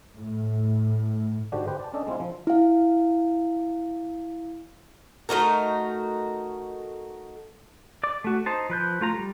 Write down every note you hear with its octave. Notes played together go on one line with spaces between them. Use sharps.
A2
G#2 D3 D4 F#4 G4
G4 B4 C5 G5
D5 A5
C#4 D4 A4 D5 D#5
G#3 C4 E4 F4
F3
E4 F5
A3 D#4 F#4 A#4
D5 D6
A3 F#4
D#4 C5 A5
F3 B4 G6
A3 F4 A#5
G3